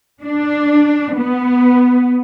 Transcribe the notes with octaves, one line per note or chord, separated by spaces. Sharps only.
D4
B3